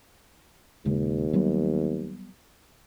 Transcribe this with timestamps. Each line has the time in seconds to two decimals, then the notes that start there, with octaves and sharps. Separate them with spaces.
0.85 D#1 D#2 C#3 G#3
1.33 F#3 G3 B3